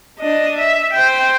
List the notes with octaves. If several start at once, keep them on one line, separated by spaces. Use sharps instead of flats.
D4 D#5
E5
C5 G5